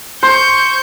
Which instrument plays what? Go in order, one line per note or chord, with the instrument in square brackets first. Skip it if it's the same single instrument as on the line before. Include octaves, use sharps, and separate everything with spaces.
[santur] C5 [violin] C#6 G6